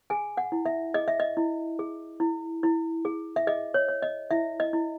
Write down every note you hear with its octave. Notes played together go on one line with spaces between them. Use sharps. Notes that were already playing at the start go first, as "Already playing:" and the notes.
G#4 G#5
F#5
E4
E5
G#4 D#5
E5
D#5
E4
G#4
E4
E4
G#4
E5
G#4 D#5
C#5
C#5
D#5
E4 E5
D#5
E4